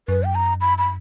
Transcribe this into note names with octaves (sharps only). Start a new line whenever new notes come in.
F#2 B4
G5
A#5
B5
B5